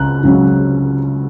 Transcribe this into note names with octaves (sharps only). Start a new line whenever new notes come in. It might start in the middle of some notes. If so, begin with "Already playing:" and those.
Already playing: C#2 C#3 A#5 F#6
C#2 C#3 F#3